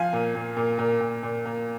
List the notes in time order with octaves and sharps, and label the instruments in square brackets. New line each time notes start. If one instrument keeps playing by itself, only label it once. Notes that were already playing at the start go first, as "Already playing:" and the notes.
Already playing: [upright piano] F3 F5 G#5
A#2
A#2
A#2
A#2
A#2
A#2
A#2